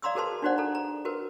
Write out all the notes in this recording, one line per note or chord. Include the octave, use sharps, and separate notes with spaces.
D5 F5 A#5 C6 D#6 E6
F#4 G#4 A#4 B4 A5 C6
D4 D#4 F#4 C5 D5 F#5
A4 A#5
A#5
F#4 A#4 B4